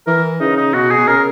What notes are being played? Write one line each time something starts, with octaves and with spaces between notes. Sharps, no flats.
E3 A#4
C#3 D#4
D#4
B2 F#4
G#4
B2
C#3 A#4